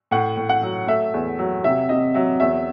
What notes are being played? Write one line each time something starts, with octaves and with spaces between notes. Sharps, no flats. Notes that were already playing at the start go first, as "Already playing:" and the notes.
A2 F#5
A2
F#5
F#3
A3 E5
E2
F#3
C3 E5
C3 D#5
F#3 E5
E2 E5